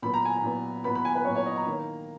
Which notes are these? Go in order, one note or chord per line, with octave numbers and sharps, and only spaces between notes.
A#2 F#3 B3 B5
A#5
G#5
A#5
A#2 F#3 B3
A#2 F#3 B3 B5
B5
G#5
B4
A#2 F#3 B3 C#5
C#5
D#5
A#5
D#3 A#3 D#4